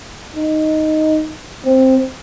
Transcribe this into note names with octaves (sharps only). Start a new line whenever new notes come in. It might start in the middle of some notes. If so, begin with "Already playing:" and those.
D#4
C4